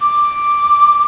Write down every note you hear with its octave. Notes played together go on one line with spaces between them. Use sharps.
D6